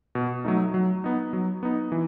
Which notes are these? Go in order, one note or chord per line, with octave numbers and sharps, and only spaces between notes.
B2
F#3 A3 D#4
F#3
B3 D#4
F#3
B3 D#4
E3